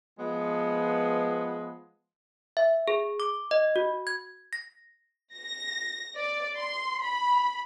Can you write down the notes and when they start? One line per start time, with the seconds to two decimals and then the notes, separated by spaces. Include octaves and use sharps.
0.18 F3 G#3 B3
2.57 E5
2.88 G#4
3.20 D6
3.51 D#5
3.76 F#4
4.07 G#6
4.53 A#6
5.34 A#6
6.15 D5
6.59 C6
7.03 B5